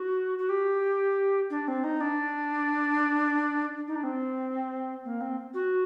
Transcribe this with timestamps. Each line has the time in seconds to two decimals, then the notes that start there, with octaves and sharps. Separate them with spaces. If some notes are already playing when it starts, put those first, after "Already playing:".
Already playing: F#4
0.38 F#4
0.49 G4
1.50 D4
1.68 C4
1.84 D#4
2.01 D4
3.88 D#4
3.95 D4
4.03 C4
5.05 A#3
5.21 C4
5.54 F#4